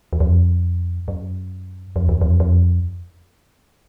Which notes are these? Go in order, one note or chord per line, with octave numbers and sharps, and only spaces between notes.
E2
F2
F#2
F2
E2
F2
F2